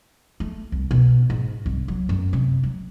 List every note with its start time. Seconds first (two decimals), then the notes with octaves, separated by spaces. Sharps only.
0.40 A3
0.72 C2
0.91 B2
1.30 G#2
1.66 C2
1.88 F#3
2.09 F#2
2.33 C3
2.63 F#3